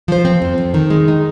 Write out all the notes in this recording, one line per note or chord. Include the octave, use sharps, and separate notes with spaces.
F3 C5
C4
F2
F2
D#3
G#3
D#4